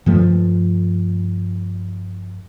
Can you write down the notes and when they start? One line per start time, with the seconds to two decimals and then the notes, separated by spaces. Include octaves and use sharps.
0.06 G2 F3 A3